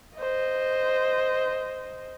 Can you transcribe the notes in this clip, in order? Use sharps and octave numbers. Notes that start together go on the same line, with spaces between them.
C5 D#5